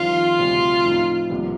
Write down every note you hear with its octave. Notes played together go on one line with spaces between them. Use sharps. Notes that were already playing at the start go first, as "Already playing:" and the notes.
Already playing: F2 D#3 G3 C4 D#4 F4
D2 C3 G3
A2 F3 C4 D#4
C2 C3 F3 A#3